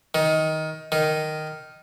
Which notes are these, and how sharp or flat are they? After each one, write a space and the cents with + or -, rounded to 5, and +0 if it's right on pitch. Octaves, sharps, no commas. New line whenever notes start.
D#3 +15
D#3 -5